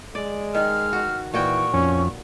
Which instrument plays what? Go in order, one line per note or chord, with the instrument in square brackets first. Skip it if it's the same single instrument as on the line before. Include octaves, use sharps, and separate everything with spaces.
[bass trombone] G#3 [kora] D5
[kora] D#3 [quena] F6
[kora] F#4
[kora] A#2 F#4 G5 [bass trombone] E3 [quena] C#6
[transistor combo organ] F2 [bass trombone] C#4